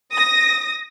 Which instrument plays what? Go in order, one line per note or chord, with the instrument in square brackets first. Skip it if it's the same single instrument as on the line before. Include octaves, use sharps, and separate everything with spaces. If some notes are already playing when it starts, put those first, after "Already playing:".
[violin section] D#6 A#6